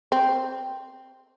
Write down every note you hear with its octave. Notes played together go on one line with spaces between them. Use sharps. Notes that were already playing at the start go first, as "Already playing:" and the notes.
C4